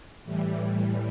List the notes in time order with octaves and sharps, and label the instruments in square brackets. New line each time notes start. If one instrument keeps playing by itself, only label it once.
[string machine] A2 E3 G3